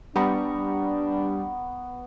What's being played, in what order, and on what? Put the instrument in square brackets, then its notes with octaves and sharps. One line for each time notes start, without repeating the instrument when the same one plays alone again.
[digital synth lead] G3 [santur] B3 A#5 C#6 [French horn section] D4